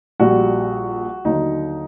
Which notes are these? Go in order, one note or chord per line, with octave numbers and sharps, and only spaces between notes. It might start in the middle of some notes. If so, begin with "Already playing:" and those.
A#1 A#2 G3 F#4
D#2 D3 F#3 D#4